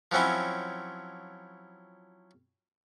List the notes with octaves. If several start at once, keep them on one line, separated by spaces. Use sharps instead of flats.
F3 F#3 C4 C#4 E4